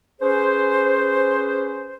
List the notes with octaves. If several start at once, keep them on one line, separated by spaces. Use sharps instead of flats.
C#4 G#4 B4 C5